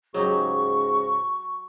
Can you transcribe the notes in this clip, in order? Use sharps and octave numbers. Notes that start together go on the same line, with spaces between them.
G#2 C#3 F#3 D#4 G4 C#6